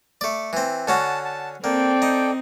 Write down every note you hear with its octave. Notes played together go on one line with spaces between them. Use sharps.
A3 D5
E3 C4
D3 C#4 F#4 A5
A5
A#3 C4 A4 D5 G5
D#4